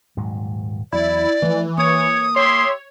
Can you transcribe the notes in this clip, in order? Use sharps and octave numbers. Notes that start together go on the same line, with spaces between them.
D#1 G#2 F#3
E2 F#3 E4 D5
E3 F3 A3
A#3 C#5 D#6
G4 C#5 E5 C6